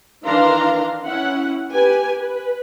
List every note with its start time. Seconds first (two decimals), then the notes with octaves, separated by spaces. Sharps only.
0.23 D#3 E3 D4 F5 A#5 C6
1.05 C#4 E4 F#5
1.71 G4 B4 G#5
2.18 B4